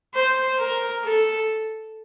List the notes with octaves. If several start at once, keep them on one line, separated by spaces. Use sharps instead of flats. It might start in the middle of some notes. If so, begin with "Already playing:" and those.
C5
A#4
A4